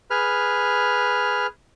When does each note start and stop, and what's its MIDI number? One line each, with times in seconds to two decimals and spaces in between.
0.10 1.47 68
0.10 1.47 71
0.10 1.47 89